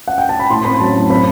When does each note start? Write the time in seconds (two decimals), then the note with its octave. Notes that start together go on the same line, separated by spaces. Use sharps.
0.08 F#5
0.18 G5
0.29 A5
0.39 B5
0.50 A2 C6
0.64 C4 B5
0.80 F#3 A5
0.95 A2
1.10 C4 B5